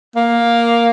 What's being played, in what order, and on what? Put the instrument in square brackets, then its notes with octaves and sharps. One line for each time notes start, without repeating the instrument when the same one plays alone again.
[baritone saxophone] A#3